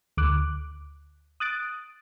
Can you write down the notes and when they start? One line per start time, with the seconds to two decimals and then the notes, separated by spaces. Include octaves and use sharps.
0.17 D2 D6 F#6
1.40 D#6 F#6 A6 D7